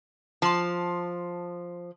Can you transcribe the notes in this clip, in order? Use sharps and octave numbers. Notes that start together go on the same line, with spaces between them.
F3 A5 C6